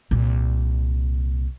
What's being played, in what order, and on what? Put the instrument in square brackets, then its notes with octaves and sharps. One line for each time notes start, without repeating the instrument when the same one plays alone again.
[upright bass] C2 A#2